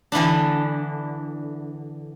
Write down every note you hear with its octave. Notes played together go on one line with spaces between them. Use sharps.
D3 E3 B3 D4